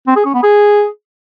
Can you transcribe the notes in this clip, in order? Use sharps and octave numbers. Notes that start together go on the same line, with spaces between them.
C4
G#4
C#4
B3
G#4